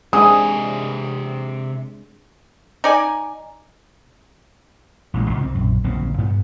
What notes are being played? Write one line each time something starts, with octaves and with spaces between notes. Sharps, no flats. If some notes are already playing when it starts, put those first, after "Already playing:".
C3 G#3 C4 D4 G#4 D#5 D#6
D#4 D5 G#5
A1 A#2 D#3 G#3
C2 G#2 C#3 F3
C4
A#1 F#2
D1 A#1 C#3 C4
G2 B3